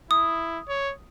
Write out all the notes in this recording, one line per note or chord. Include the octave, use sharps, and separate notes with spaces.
E4 D#6
C#5